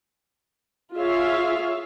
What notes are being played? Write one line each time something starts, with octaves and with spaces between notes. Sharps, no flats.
F4 G#4 C#5 E5 F5